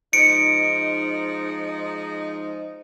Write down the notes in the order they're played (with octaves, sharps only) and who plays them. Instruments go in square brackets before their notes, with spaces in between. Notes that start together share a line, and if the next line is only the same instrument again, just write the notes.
[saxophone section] F3 G#3 D#4 [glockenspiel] C#7 D7